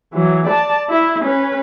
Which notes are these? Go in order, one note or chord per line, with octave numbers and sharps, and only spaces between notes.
E3 F#3
D5 A5
E4
C#4 B4